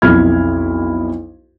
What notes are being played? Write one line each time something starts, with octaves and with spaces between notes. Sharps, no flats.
B1 F2 E4 F6 G#6